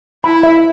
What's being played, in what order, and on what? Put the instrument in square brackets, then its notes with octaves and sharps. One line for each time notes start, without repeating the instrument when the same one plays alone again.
[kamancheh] E4 [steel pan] B5
[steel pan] E5